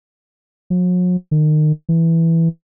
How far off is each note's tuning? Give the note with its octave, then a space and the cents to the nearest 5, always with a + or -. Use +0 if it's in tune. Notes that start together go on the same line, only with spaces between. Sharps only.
F#3 -45
D#3 -30
E3 +0